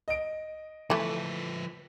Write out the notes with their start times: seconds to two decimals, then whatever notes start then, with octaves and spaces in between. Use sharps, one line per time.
0.08 D#5 D7
0.90 E3 F3 A3 B4